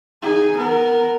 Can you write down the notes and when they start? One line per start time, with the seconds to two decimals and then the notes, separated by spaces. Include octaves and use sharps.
0.22 D#4 G#4
0.56 B3 A#4